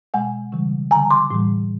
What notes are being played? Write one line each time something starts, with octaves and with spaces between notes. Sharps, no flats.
B2 G#3 F#5 G#5
C#3 E3 G3
D3 G3 G#5 A#5
C6 D6
A2 E3 G3